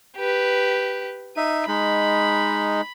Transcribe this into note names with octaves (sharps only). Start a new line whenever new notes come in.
G4 B4
D#4 E5 D#7
G#3 D#4 B5